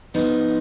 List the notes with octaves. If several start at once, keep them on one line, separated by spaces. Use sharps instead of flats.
G#2 F3 B3 D#4